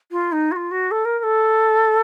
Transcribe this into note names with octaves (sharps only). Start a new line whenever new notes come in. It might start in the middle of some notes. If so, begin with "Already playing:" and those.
F4
D#4
F#4
F4
F#4
A4
A#4
A#4
A4